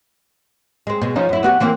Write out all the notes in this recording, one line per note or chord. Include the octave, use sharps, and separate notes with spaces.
G#3 C4
B2 G#3
F3 C#4 D#4
F#2 E4
B3 F#4 G4
E3 A#3 C4